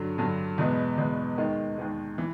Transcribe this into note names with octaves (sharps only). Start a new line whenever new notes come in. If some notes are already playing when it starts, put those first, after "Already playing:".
Already playing: G2 D3 F#3
G2 D3 F#3
E2 B2 G#3 B3
E2 B2 G#3 B3
D#2 D#3 G#3
D#2 D#3 G#3
E3